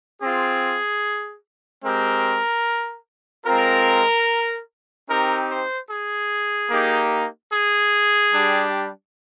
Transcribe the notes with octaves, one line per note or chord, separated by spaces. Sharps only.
C4 F4 G#4
G#3 C4 G4 A#4
G#3 C4 F4 A#4
C4 D#4 G4 A#4
C5
G#4
A#3 D#4 G4
G#4
G3 D4 G4